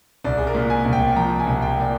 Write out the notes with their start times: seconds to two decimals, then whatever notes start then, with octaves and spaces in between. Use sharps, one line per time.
0.24 C2 D5
0.38 G#4
0.47 A#4
0.55 A#2
0.70 G#5
0.85 C2
0.93 G5
1.16 F3 A#5
1.39 G#5
1.47 C2
1.62 G5
1.78 A#2 D5